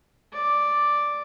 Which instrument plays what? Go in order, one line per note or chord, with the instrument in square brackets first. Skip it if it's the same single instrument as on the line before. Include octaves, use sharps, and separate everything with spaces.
[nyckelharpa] D5